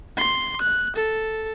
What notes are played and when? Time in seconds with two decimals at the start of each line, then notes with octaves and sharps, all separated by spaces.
0.17 C6
0.62 F#6
0.96 A4